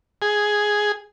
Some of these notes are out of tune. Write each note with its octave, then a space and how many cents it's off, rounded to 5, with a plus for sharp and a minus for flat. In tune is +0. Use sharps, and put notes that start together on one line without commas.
G#4 +5